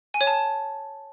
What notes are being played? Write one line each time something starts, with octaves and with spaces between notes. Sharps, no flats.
G#5
C#5
A5